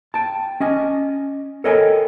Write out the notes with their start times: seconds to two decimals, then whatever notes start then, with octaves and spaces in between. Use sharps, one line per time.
0.14 G5 A5
0.60 C#4 D#5 G#5
1.64 A4 A#4 C#5 D#5 G5 G#5